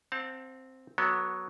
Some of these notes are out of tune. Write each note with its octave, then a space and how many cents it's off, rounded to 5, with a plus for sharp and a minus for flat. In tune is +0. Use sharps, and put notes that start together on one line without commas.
C4 +0 F5 +45 A5 +20
F#3 +0 B3 -15 A4 +25